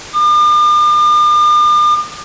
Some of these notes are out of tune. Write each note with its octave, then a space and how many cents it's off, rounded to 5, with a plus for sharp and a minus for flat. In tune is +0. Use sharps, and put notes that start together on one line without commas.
D6 +45